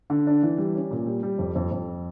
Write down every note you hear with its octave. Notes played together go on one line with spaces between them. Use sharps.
D3
D4
E3
G3
C#4
A#2
G3
G3
F2
F2
F2